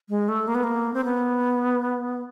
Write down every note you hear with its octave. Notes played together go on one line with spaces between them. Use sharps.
G#3
A3
A#3
B3
A#3
C4
B3